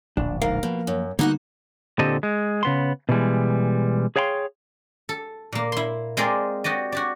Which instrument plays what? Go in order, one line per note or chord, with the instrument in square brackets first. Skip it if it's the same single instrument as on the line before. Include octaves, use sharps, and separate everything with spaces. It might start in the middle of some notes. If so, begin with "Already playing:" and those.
[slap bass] D1 A#1 [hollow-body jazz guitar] D4
[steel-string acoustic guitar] G#2 [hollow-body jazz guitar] A#4 F5
[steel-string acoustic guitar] B2 [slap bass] F3 A#3
[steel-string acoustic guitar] F#2
[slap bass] D3 G3 B3 [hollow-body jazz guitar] A#3 [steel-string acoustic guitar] D#4 F#4 F#5
[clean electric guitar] A#2 D3 C4 G4 A4 D#5
G#3
C#3 B3 C6
B2 D3 E3 G3 G#3
G#4 C#5 F5 G5 B5 C6
[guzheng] A4
A#2 A#3
E4 C6
G#3 C4 F4 G#4 A#4 D5
F#4 G4 D5 D#5
F#4 G4 D5